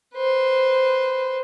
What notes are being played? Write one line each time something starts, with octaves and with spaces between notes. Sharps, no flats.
B4 C5